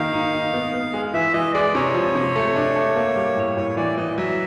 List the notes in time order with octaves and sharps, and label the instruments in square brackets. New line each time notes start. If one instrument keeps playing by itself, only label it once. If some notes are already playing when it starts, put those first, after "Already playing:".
Already playing: [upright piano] D#3 A#3 D#4 [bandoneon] F5
[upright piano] D#4
D#4
B3
B3
G#3
[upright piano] E3 [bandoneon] E5
[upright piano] E3 [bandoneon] D#5
[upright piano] G#3 [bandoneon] D5
[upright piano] C3 [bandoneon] C#5
[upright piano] F3
C3
A3
D4
A3
A#3
G3
A2
[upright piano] A2 [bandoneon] C#5
[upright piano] E3 [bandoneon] D5
[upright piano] E3 [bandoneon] D#5
[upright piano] F#3 [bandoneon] E5